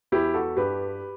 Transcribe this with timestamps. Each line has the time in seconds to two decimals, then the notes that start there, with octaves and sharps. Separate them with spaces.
0.12 E2 E4 G4
0.34 F#4 A4
0.57 G2 G4 B4